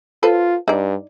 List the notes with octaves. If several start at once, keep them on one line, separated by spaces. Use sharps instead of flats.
F4 A4 B4 C5
G2 D#4 D5